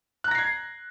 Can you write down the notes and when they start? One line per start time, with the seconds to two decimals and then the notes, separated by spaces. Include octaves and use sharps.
0.24 F#6
0.28 A#5
0.31 A#6
0.35 C7
0.38 G#6